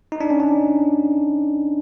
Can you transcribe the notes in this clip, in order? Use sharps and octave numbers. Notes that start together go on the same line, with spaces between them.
D#4
D4
C#4
D4